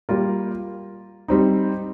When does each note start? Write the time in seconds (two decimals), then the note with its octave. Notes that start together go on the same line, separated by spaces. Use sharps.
0.09 G3 A#3 F4 A#4
1.28 G3 C4 D#4